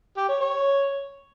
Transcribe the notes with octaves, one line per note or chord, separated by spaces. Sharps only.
G4
C#5
C#5